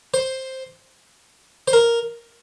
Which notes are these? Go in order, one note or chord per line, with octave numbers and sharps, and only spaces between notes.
C5
C5
A#4